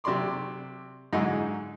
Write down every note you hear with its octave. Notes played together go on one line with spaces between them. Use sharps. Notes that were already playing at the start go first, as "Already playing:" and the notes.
C3 F#3 D5 C6 D6
G#2 D3 F#3 D#4 E4 G#4